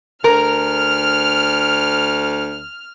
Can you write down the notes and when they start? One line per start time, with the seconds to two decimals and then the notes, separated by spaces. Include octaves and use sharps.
0.24 D2 A#4 F6